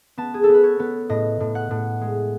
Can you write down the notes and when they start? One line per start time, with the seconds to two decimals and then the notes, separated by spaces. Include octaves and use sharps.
0.17 B3 A5
0.34 G#4
0.44 A4
0.49 B3
0.54 B4
0.63 C#5
0.79 B3
1.09 A2 D#5
1.40 A2
1.55 F#5
1.71 A2
2.01 G#3